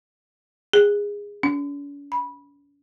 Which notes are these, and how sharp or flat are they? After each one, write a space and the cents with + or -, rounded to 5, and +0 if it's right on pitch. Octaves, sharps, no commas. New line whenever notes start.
G#4 -20
C#4 +45
B5 -15